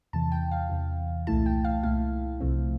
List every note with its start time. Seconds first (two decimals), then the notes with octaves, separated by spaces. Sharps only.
0.13 E2 C3 E3 A5
0.32 G5
0.51 F5
0.69 E2 C3 E3
1.27 C2 A#2 A3 E4 A5
1.46 G5
1.65 F5
1.83 C2 A#2 A3 E4 F5
2.40 C2 C3 F3 A3 C4